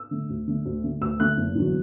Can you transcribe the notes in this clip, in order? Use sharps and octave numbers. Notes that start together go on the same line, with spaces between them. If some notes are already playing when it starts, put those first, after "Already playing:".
Already playing: E6
D3 A3
D2
D3 A3
D2
D3 A3
D2 E6
D3 A3 F#6
F#1
E2 D3 F#3